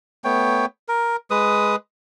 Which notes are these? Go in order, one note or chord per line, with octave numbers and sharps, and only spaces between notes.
A3 B3 C#5 G5
A#4
G#3 B4 D#6